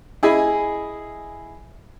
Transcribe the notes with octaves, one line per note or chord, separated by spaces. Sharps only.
E4 G#4 D#5 G#5 B5